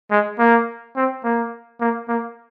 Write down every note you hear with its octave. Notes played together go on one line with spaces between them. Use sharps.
G#3
A#3
C4
A#3
A#3
A#3